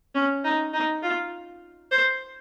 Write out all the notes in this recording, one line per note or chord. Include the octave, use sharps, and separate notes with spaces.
C#4
D#4
D#4
F4
C5